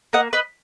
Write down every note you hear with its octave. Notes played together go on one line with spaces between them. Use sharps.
A#3 D#5 F#5
B4 D#5